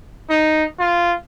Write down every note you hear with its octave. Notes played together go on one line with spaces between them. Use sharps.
D#4
F4